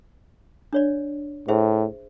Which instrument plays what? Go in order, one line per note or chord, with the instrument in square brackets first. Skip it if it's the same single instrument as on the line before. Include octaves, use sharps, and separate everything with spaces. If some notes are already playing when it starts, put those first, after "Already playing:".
[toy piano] D4 C#5 D5
[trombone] A2 [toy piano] G#4 C5 E5